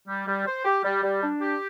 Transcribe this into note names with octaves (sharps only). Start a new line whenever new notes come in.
G3
G3
C5
G4
G3
G3
D4
G4